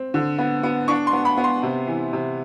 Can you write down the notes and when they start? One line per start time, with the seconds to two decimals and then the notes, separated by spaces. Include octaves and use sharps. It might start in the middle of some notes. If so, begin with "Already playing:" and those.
Already playing: C4
0.14 D3
0.38 B3
0.63 B3
0.88 D4 C#6
1.07 C6
1.13 B3
1.25 B5
1.38 B3
1.44 C6
1.63 C3
1.87 E3
2.13 C3